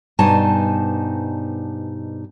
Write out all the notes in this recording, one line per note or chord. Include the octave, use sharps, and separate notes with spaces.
G2 B2 D#4 C5 G#5 A5